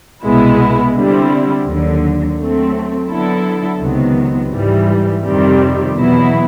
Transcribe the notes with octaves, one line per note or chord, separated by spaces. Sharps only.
C2 B2 G#3 B3 E4
D3 G3 C4 E4
D#2 D3 F#3
F#3 A3 C4
D3 F#3 B3 E4 A4
C#2 C3 D#3 F#3 B3
G#2 E3 G3
F2 C3 D#3 G3 C4
E2 B2 F#3 B3 E4